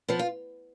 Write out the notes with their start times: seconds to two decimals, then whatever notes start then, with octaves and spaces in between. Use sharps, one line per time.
0.08 F3 B3
0.19 F4